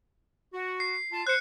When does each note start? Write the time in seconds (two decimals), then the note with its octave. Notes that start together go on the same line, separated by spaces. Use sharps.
0.54 F#4
0.80 C7
1.11 F4 A5
1.27 C5 F#6 C#7